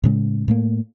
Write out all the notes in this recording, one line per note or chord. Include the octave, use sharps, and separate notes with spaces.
A2 C#3 G#3
A2 A3 A#3